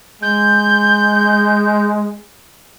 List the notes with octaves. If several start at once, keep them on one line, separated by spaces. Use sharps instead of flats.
G#3 G6